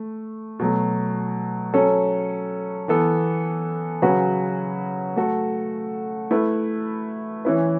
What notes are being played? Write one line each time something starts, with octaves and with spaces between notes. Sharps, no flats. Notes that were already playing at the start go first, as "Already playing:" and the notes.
Already playing: A3
B2 F#3 A3
F#3 C#4 A4
E3 B3 A4
C#3 F#3 C#4 F#4 B4
A3 F#4 A4
A3 E4 B4
E3 C#4 E4 B4